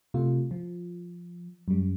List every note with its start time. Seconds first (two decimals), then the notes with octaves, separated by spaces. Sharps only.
0.14 C3 A3 F4
0.51 F3
1.68 F#2 G3